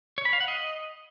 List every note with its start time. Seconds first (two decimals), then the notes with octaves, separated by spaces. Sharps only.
0.18 C#5
0.25 B5
0.33 F5
0.40 F#5
0.48 D#5